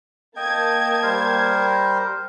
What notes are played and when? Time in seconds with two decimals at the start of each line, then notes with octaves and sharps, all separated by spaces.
0.37 A#3 D#5 G5 A5 G#6
1.03 G3 A#4 C5